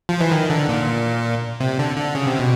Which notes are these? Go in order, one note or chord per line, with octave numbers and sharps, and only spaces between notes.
F3
E3
D#3
D3
A#2
C3
D3
D3
C#3
C3
B2